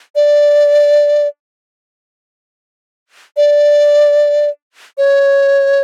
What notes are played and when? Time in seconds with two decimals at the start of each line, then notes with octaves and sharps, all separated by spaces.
0.15 D5
3.37 D5
4.98 C#5